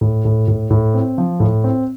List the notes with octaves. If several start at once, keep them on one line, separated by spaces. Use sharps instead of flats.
A2
A2
A2
A2
C4
F3
A2
C4